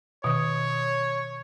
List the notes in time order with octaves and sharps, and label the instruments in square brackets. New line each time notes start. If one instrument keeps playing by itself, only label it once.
[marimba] B2 D#3 D#6 [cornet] C#5